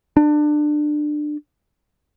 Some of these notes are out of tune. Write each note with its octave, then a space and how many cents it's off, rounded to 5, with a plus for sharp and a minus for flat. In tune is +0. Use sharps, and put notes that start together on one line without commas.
D4 +25